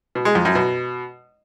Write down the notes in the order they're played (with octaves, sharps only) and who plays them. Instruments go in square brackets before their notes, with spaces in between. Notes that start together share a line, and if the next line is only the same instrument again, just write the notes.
[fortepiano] B2
G#3
F2
F#2
B2